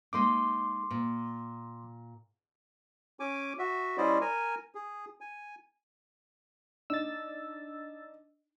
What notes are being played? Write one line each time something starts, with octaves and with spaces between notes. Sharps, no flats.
G#3 A#3 D#4 C6 D6
A#2
C#4 G#5 D6
F#4 E5
G3 C#4 E4 C5 D5 D#5
A#4 G#5
G#4
G#5
D4 D#4 E6 A6